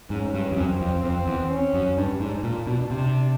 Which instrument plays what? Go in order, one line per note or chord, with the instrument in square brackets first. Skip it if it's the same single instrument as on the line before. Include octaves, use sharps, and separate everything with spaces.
[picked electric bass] G#2 [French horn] C#4
[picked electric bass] G2
F2
[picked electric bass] F#2 [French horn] C4
[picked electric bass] F2
[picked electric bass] F2 [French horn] C4
[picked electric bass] E2
[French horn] C#4
[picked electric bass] F#2
[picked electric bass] G2 [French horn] D4
[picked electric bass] G#2
A#2
B2
C3